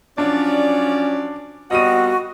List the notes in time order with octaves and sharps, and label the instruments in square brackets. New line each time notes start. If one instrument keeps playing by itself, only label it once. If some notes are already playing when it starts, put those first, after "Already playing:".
[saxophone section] F3 F#3 D5 [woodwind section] C#4 [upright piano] D4
[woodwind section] A#2 B3 [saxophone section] G3 C4 F#5 [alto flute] F#4 [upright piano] D#5 D#7